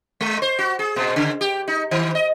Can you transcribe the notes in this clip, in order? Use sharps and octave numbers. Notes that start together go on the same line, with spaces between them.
G#3
C5
F#4
G#4
A#2
C#3
G4
D#4
D#3
D#5